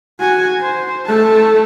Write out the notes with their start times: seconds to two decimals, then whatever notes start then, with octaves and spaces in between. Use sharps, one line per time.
0.20 F#4 G#5
0.61 C5
1.06 A3 A5